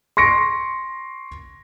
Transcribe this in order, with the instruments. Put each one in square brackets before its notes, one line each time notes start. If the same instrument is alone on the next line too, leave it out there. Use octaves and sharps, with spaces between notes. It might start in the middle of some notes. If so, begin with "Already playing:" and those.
[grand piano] C6 C#6 A#6 C#7 D7